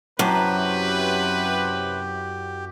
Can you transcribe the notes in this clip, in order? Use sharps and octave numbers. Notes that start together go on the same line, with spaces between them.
F#2 C3 F#3 E4 G4 B4 A5 A#5